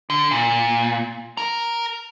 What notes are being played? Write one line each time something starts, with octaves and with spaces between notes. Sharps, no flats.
D3
A#2
A#4 A#5